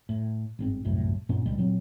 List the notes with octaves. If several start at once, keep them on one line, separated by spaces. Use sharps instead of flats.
A2
G1 G#2 C4
G1 C2 F#2 A2
G2 A#2 B3 C#4
C#2 G3 G#3
A#2 F#3 C4